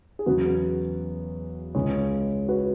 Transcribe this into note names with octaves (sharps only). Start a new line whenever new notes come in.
G#4
E2 C#3 F#3 B3 F#4 B4
C#2 C#3 G#3 G#4 C#5
F#4 B4